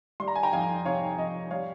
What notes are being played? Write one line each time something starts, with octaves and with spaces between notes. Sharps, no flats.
G3 C6
A#5
G#5
G5 A#5
F2 F5 G#5
C3 C#5 F5
F2 D#5
G3 C#5 F5